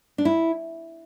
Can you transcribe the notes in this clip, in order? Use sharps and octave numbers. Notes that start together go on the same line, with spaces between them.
D4
E4